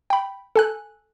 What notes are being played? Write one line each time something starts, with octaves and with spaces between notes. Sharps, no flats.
G5 B5
A4 G#5 F#6